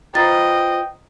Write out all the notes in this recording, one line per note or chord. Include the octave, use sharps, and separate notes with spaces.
F4 B4 C5 D#5 G5 A#5 A6